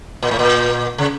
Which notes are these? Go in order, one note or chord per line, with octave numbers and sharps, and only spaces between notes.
A#2
A2
A#2
C#3